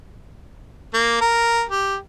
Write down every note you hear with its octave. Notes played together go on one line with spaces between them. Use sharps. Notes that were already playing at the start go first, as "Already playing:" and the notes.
A#3
A#4
G4